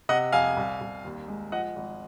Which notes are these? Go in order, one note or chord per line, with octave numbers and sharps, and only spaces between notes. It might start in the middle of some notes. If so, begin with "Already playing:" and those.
C3 D#5 F#5
F2 F5 G#5
C2
C2
D#2
G#3
F3 D#5 F#5
G#1